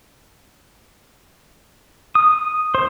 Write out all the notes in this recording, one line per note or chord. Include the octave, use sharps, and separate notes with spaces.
D#6
C5